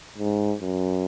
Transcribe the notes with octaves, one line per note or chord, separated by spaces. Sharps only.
G#2
F#2